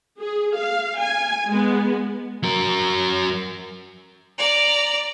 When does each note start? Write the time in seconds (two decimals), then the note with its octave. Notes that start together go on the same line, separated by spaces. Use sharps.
0.21 G#4
0.57 F5
1.00 G#5
1.47 G#3 B3
2.43 F#3 A#4
4.39 D5 A#5